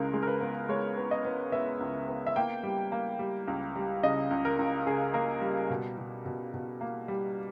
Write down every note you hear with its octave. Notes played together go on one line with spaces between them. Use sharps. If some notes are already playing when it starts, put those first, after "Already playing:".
Already playing: C#2 C#3 G#3 A#4
G#3
A#4
B4
B3
G#3 C#5
B3
D#5
B3
B3 E5
C#2
B3
E5
A#3 G5
G3
A#3
G3
C#2
G3
C#3 D#5
C#2
A#4
C#2
C#3 G#4
A#3 A#4
G3
B2
B2
B2
B2
A#3
G3